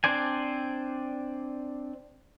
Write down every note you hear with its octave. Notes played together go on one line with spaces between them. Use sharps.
C4 D4 C5 D5 G#5